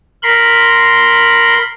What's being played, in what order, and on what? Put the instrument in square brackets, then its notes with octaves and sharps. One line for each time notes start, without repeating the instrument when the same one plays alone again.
[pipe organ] A#4 B5 C6